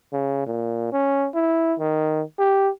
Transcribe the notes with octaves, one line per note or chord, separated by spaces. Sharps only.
C#3
A#2
C#4
E4
D#3
G4